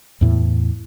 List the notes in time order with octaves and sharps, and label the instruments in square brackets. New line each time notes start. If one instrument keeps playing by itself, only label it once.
[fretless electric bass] E2 A2 E3